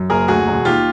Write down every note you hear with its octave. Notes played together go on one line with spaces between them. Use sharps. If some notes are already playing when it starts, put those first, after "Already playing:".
Already playing: F#2
F#1 G#4 A#4
D2 F#4 G#4
E1
D#2 F4 G4